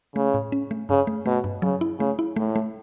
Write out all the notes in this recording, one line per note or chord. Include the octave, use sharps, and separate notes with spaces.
C#3 A3
A2
C#4
A3
G2 C#3
A3
B2 A3
G2
C#3 F#3
E4
C#3 A3
E4
A2 A3
A3